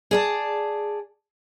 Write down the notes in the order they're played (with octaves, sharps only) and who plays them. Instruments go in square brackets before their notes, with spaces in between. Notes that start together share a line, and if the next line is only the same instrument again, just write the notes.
[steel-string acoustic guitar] G#4 D5 A5